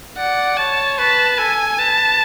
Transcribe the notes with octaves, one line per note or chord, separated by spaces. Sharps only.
D5 F#5
C#5 A5
B4 A5
A4 G#5
B4 A5